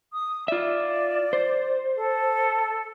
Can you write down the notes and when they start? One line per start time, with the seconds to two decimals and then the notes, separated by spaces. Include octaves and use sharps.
0.13 D#6
0.48 F4 D5 E5
1.33 C5
1.96 A4